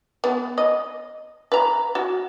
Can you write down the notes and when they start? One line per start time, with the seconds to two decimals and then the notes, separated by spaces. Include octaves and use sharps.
0.24 B3
0.58 D#5
1.52 B4 A#5
1.95 F#4